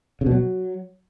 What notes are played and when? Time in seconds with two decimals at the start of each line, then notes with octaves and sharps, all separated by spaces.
0.21 C#3
0.26 B2
0.32 F#3